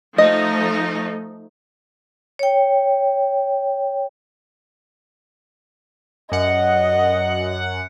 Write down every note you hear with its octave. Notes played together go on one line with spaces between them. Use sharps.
F3 A3 D#4 D#5
C#5 G5
F#2 D#5 F#5